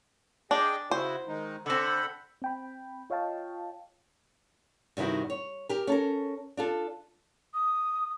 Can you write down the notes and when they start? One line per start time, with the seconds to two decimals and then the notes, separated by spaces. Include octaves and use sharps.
0.51 D4 G#4 D#5 G5
0.91 C#3 E4 F#4 C5
1.27 D#3 G#3 D#4
1.66 D3 C4 A4 F#5 B5
2.42 C4 G5 B5
3.10 F4 C#5 D#5 F5 G5 A5
4.97 G2 C3 D#3 E4 F#4
5.30 C#5
5.69 G4 A#4
5.87 C#4 A4 A#4
6.57 D4 F4 A4
7.54 D#6